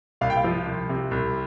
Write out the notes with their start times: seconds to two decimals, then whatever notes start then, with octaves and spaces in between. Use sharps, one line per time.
0.21 C2 F5
0.30 G5
0.37 F5
0.44 F3
0.66 C2
0.89 C3
1.11 C2